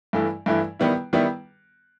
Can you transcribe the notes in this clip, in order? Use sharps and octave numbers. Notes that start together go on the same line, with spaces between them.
G2 E3 A3 E4
G2 E3 A3 E4
D#3 G3 B3 E4
D#3 G3 B3 E4